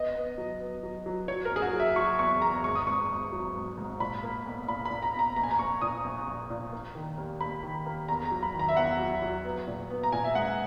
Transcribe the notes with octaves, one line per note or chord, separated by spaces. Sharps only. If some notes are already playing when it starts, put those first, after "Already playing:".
Already playing: B3 D#5
B3
F#3
B3
F#3
F#3
F#3 C#5
A#4
F#1
G#4
F#4
F#3
E5
F#3 C#6
E2 C#6
E2 A#5
G#1 C#6
D#6
G#1 C#6
G#1
F#3
G#1
G#2
A#2 B5
A#3
B1
A#2 B5
B5
A#2
A#5
B1 A#5
A#1 A#5
G#5
A#5
A#1 C#6
A#2 D#6
A#1
A#1
A#2
A#3
D#3
D#2
D#2 B5
D#3
A#3
E2 A#5
A#5
F#3
B5
D#3
A#5
E5
E2 F#5
F#3
F#3
B3
A#2
B3
A#5
A#2 G#5
E5
G#3 F#5